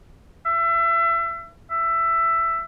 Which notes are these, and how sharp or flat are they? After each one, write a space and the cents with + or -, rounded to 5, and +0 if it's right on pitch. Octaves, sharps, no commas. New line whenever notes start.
E5 +30
E5 +15